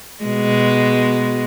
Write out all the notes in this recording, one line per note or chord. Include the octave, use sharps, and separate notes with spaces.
B2 G#3